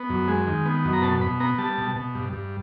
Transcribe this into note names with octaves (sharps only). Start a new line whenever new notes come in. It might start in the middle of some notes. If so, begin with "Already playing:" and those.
Already playing: B3
F#2
G#3
D#3
B3
F#2
A#5
B2 A5
B2 B5
B3 A#5
G3 A5
B2
B2
G2
G2